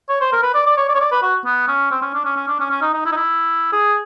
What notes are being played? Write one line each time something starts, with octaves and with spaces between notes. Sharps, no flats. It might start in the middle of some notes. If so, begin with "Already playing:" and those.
C#5
C5
A#4
B4
D5
D5
C#5
D5
C#5
D5
B4
F#4
B3
C#4
C4
C#4
D4
C#4
C#4
D4
C#4
C#4
D#4
D#4
E4
D#4
E4
G#4